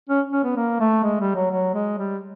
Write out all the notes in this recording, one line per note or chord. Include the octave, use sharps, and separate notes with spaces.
C#4
C#4
B3
A#3
A3
G#3
G3
F#3
F#3
G#3
G3